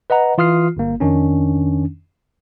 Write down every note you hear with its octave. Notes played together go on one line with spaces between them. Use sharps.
B4 D#5 F#5 A#5
E3 F4 D#6 F6 C7
G1 A#3
F2 D#3 C#4 D4